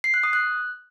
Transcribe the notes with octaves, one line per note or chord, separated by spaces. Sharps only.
C7
F#6
D#6
F#6